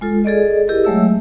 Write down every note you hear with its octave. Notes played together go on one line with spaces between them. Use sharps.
G#3 F4 A4
G#4 A4 D5 D#5
E4 G4 G#4 A#4 D#5
F#3 G#3 A3 C#5 E5 E6